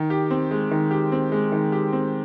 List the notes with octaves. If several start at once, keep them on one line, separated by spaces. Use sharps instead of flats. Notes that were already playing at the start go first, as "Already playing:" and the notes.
Already playing: D#3
G4
C4
G#3
D#3
G4
C4
G#3
D#3
G4
C4